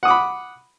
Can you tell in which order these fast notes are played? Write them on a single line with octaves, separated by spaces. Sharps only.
F#5 D#6 D6 B5